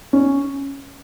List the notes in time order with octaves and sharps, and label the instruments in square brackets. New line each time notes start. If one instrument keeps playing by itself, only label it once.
[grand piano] C#4